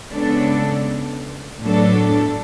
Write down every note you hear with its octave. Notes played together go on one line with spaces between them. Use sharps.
C#3 G#3 B3 D4 A4
A2 F#3 B3 D4 A4